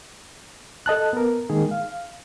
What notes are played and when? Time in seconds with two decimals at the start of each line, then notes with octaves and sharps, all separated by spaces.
0.86 A4 D#5 A5 F#6
1.13 B3 A#4
1.50 D#3 G#3 A#3 G#4
1.71 F5